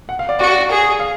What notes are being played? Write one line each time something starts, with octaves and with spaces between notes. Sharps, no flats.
F#5
F5
D5
F#4 D5
G#4
F5